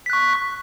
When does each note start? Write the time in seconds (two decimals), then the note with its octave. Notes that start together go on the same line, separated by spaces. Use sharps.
0.06 B6
0.10 F#6
0.13 C#6